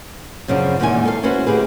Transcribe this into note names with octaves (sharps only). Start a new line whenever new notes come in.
F#2 C#3 F3 D4
E2 A#2 D3 D#3 G#3 G#5
A4 F5
C#4 E4 F#4 B4 C5
D2 D3 G4 G#4 B4